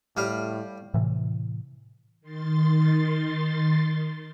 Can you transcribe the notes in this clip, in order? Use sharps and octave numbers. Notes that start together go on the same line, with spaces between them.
A2 G3 F5
A2 C3 E3
D#3 C6 A6